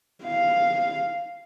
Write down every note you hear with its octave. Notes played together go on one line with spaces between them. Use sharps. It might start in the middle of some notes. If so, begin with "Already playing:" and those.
F5